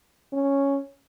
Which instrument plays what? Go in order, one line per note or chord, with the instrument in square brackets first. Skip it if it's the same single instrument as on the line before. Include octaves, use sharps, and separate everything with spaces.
[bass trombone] C#4